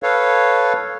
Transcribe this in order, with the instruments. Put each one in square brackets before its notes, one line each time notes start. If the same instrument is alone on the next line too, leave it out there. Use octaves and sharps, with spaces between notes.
[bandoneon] A4 B4 C#5 F5